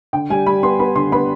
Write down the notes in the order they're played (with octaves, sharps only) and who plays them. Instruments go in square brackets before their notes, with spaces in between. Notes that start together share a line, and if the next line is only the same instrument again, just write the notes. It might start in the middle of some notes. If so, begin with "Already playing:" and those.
[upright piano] D3 G5
G3 G#5
G3 B5
B3 C6
B3 B5
D3 C6
B3 B5